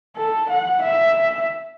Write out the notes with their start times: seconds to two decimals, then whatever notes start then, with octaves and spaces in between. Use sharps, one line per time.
0.16 A4
0.50 F#5
0.82 E5